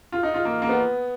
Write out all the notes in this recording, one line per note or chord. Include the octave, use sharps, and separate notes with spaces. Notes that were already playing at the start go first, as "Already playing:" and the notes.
F4
D#4
F4
A#3
A#3
B3